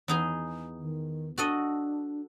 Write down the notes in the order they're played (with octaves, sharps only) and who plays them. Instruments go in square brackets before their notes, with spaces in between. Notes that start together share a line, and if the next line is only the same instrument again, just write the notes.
[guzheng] E2 D#4 G#4
[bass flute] D#3
[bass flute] D4 [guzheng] F#4 A4 D#5